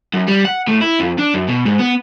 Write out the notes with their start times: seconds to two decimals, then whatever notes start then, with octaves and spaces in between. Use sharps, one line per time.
0.13 F#2
0.28 G3
0.45 F#5
0.68 A2
0.81 E4
1.00 F2
1.19 D4
1.34 F#2
1.48 B2
1.65 G#2
1.79 B3